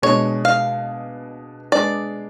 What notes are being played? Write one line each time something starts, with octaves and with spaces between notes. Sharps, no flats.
B2 G#3 D4 C#5
F5
G#3 D4 G#4 B4 D5